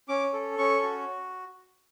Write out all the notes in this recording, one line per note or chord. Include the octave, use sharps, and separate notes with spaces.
C#4 D6
A4
C#4 C#6
F#4